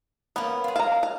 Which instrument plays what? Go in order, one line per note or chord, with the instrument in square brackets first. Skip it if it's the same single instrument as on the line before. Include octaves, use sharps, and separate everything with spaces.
[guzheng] A#3 C#4 [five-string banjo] B3
[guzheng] F4 G#4
[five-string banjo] F5 A#5 [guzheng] A5
[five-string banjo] F5